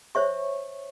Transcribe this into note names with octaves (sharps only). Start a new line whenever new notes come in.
C5 C#5 E5 C#6